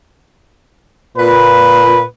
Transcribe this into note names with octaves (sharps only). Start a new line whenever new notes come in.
A#2 B4